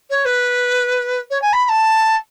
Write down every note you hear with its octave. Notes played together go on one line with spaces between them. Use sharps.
C#5
B4
C#5
G#5
B5
B5
A5